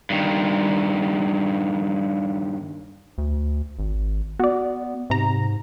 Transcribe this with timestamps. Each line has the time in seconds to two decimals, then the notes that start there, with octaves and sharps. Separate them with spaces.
0.10 G2 D#3
3.18 D2
3.79 G#1
4.39 B3 F#4 D5
5.10 G#2 C3 A#5